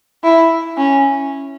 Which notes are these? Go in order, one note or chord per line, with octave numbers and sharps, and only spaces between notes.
E4
C#4